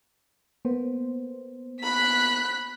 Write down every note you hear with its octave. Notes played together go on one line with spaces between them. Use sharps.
A#3 B3 C5
B5 F#6 B6